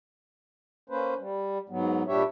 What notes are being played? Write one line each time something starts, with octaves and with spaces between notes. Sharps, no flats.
A#3 C#4 B4 C5
G3
G#2 F#3 B3
A#2 G3 D4 G4 C#5 E5